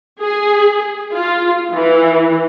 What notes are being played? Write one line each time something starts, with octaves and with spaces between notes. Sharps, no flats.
G#4
F4
E3